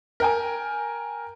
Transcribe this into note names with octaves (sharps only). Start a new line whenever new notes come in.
A#4 G5 G#5